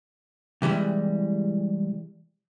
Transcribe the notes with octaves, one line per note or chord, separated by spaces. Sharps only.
C3 E3 G3 G#3